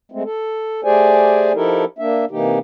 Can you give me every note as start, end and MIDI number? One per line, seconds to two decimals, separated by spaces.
0.12 0.23 56
0.12 0.23 57
0.12 0.23 60
0.24 0.81 69
0.84 1.53 57
0.84 1.53 67
0.84 1.53 68
0.84 1.53 72
0.84 1.53 74
0.84 1.53 80
1.55 1.85 53
1.55 1.85 63
1.55 1.85 64
1.55 1.85 67
1.55 1.85 69
1.55 1.85 70
1.99 2.25 58
1.99 2.25 62
1.99 2.25 76
2.31 2.59 48
2.31 2.59 52
2.31 2.59 58
2.31 2.59 63
2.31 2.59 67